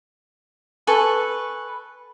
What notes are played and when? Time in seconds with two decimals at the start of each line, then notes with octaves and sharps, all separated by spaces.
0.87 A4 B4 G#5 C#6